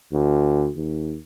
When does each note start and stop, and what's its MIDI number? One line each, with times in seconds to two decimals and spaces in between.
0.13 0.69 38
0.76 1.17 39